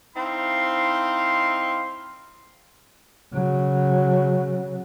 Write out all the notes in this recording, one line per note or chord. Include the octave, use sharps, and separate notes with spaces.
C4 D#4 E4 F5 C6
C#3 F#3